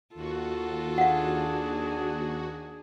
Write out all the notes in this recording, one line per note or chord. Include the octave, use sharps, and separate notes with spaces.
D#2 F4 F#4 A4
D4 G#4 F5 F#5